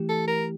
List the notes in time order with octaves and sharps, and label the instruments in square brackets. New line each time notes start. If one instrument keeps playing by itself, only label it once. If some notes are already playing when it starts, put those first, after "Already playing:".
Already playing: [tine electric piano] E3 A3 E4 G4
[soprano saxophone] A4
A#4